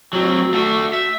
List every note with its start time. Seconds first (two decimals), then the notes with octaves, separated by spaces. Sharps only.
0.13 F#3 C4
0.53 A3 F#4
0.93 E5